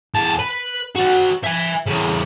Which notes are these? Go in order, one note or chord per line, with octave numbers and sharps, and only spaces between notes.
E2 A5
B4
F#4 D5
E5 G#5
E2 C#3